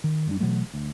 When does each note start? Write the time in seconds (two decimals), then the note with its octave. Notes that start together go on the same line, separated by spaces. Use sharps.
0.04 D#3
0.27 F#2 G3 D4
0.40 B2 E3 F#3 A3
0.74 D2